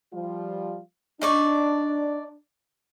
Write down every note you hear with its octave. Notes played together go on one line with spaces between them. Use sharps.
F3 G3 F4
D4 D#4 D5 C#6